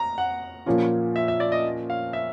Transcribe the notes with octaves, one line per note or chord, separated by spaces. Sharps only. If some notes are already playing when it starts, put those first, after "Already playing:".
Already playing: A#5
F#5
A#2 F3 A#3 C#4 F4
E5
E5
D5
D#5
F5
E5